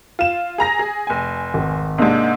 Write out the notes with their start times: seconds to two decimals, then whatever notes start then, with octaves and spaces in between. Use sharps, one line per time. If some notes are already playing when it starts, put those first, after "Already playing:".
0.19 F4 E7
0.58 G#4 A#5 A#6
0.79 G#4
1.07 F1 G#5
1.54 G#1
1.98 G#2 C3 A#3 D4 D#4